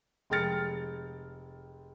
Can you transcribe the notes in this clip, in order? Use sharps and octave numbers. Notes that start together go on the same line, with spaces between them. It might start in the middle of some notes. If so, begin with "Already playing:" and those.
F1 G#3 G5 F6 A6 C#7